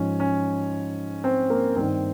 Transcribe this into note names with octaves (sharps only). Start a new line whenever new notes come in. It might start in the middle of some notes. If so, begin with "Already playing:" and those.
Already playing: G#2 F3 C#4
C#4
C4
A#3
G2 D#3 C4